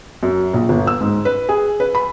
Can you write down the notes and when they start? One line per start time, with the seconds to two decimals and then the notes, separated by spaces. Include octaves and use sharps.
0.23 F#2
0.54 A#1
0.69 G1
0.87 E6
1.01 G#2
1.25 B4
1.49 G#4
1.80 B4
1.95 B5